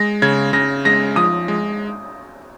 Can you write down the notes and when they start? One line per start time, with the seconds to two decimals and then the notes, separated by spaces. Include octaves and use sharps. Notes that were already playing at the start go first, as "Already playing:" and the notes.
Already playing: G#3 A#6
0.22 C#3 G#6
0.53 C#3 A#6
0.85 G#3 A#6
1.16 F3 D#6
1.48 G#3